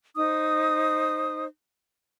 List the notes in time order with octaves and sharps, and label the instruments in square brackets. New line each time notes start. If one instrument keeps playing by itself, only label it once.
[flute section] D#4 C5 D#6